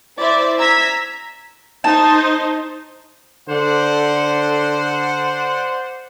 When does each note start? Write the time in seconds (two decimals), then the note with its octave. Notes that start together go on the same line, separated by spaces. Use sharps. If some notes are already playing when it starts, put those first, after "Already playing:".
0.19 E4 C5 D5 E5
0.58 A#5 E6 G#6 B6
1.84 D#4 C5 A5
3.49 D3 C5 D5 F#5